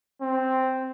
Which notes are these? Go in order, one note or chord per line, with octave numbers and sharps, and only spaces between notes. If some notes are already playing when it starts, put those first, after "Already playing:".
C4